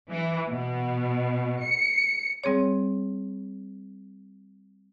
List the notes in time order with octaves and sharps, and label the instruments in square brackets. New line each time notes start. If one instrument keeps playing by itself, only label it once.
[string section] E3
B2
C#7
[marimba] G3 C4 G#4 C#5